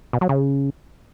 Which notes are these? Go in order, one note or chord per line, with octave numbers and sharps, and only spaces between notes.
B2
F#3
C#3